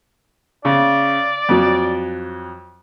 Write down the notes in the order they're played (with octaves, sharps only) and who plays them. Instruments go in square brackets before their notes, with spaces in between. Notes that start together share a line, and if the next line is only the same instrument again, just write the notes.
[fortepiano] C#3 [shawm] D5
[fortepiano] F2 F#3